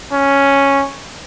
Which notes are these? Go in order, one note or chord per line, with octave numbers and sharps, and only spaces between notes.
C#4